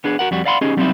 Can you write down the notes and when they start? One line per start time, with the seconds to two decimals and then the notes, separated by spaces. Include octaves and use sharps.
0.04 B3 D4 G#4
0.19 F#4 A#4 F#5
0.31 F2 G3 F#4
0.45 D5 F5 F#5 B5 C6
0.61 C#4 D#4 G4 G#4 D#5
0.77 F#3 G3 C4 C#4 D#4 E4